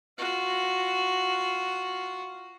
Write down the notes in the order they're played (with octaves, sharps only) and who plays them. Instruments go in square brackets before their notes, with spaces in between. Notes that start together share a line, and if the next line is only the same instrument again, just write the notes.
[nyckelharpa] F4 F#4